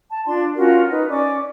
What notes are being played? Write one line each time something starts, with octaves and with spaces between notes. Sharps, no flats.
A5
D4 F4 D5 C6
C#4 F4 F#4 A#4
D#4 B4
C#4 D5 D6